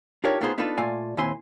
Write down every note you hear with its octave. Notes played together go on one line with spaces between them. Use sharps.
D4 D#4 F4 G4 A#4 C#5
A3 B3 D#4 F4 G#4 C5
B3 D4 D#4 F4 A4 B4
A#2 A3 F4 D5 G#5
D#2 A#2 C4 E4 G#5 C6